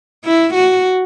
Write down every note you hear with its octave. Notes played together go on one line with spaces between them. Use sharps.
E4
F#4